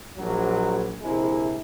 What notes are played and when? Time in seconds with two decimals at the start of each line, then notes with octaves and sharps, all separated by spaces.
0.17 A#1 F#3
1.02 A#1 C3 G#3 E4